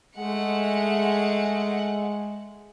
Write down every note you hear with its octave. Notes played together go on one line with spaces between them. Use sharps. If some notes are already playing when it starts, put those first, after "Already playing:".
G#3 A3 F#5